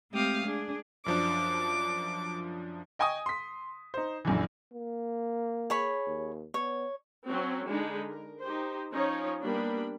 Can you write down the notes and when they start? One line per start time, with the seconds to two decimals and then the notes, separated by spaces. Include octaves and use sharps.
0.11 G#3 A3 C4 G4 F5 D#6
0.43 D4 G#4
1.06 F#2 F3 D4 D6
2.99 D#5 G5 G#5 C#6 D#6
3.26 C6 B6
3.94 D#4 C5
4.25 A#1 F#2 D3 E3
4.74 A#3
5.70 G#4 C#5 B5
6.07 D#2
6.54 B3 C#5
7.28 F#3 C4 C#4 F#4
7.68 D3 G#3 D4 D#4 B5
8.10 A#4
8.42 D#4 G4 C5
8.91 F3 C#4 D#4 C#5
9.43 G3 A#3 B3 D4 B5